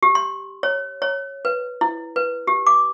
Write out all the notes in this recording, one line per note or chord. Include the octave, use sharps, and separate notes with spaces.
G4
C6
C#5
C#5
B4
E4
B4
G4
D6